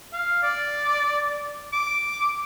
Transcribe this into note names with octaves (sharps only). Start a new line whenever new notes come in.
F5
D5
D6